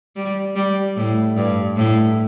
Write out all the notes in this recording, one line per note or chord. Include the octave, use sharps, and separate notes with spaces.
G3
G3
A2
G2
A2